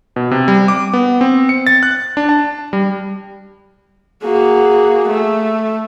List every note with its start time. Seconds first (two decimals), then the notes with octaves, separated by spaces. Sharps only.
0.16 B2
0.31 C3
0.48 G3
0.68 D6
0.93 B3
1.21 C4
1.49 C#7
1.67 A6
1.83 F#6
2.17 D4
2.29 A5
2.73 G3
4.23 A#3 F#4 G#4
5.08 A3